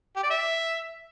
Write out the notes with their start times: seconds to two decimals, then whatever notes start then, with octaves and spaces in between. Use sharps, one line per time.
0.16 G4
0.23 D5
0.30 E5